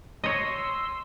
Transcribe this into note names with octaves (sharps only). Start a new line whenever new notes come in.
C#5 D#5 C6 E6